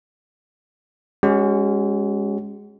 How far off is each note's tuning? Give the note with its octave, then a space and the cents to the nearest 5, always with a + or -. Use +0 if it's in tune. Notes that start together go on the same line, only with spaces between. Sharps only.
G#3 -15 C#4 +0 F#4 +30